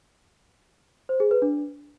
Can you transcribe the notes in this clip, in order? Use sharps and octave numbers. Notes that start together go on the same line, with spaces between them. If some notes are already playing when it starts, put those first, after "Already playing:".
C5
G#4
B4
D4